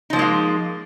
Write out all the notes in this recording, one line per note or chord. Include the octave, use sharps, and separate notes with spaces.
F3 G#3 A#3 D#4 F4